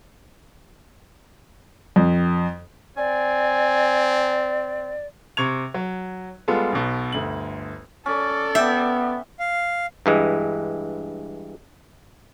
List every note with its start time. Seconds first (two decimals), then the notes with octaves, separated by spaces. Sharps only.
1.96 F2
2.97 C4 D5 G#5
5.37 C3 C#6 G#6 F7
5.74 F#3
6.48 G3 G#3 B3 F4 A4
6.72 B1 B2
7.12 G1 D2 F#7
8.06 C#4 A4 D5
8.55 B3 E5 G5
9.39 F5
10.06 G2 E3 G#3